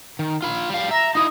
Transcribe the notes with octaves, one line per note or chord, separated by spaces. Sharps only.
D#3
F4 B5
G3 F5
E5 A#5
D#4 E4 D#6